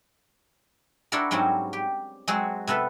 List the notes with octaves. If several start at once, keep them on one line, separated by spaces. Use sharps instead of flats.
D4 E4 F#4 A4 A#4
G#2 F#3 G3 C4 C#4
G4
F#3 G#3 C4 F#4 G#4
C3 B3 A4 B4